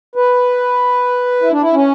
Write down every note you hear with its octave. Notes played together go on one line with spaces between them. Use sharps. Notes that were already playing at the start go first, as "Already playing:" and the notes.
B4
E4
D4
E4
C#4